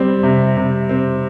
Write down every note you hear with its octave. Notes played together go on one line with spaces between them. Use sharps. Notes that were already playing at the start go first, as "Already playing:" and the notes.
Already playing: G3 C4
C3
C3
C4